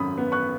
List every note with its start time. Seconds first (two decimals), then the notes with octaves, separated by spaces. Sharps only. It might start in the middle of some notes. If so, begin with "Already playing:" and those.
Already playing: G#1 F#2 B5 D#6
0.18 B3
0.32 C#6 F#6